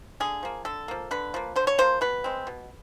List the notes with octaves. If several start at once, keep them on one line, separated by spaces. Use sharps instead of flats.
D3 G#4
F3 A#3
D3 A4
F3 A#3
D3 B4
F3 A#3
D3 C5
C#5
F3 A#3 C5
B2 B4
G#3 C4
B2